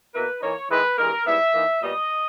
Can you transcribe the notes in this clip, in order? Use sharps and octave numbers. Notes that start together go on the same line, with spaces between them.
B2 A#3 E4 B4
E3 A#3 D#4 C#5
D#3 G#3 B3 E4 B4
G2 E3 G#3 D#4 A#4
G#2 G3 B3 E4 E5
E3 A#3 D#4
A#2 G3 B3 D#5